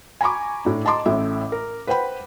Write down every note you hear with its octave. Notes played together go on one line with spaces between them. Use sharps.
G#5 A#5 B5 C#6 D6
A2 D4
D#5 A5 A#5 C6 D6
A1 A2 E5
A#4
B4 C5 F#5 G5 B5